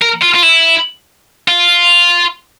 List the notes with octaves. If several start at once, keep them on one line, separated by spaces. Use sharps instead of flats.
A#4
F4
F4
E4
F4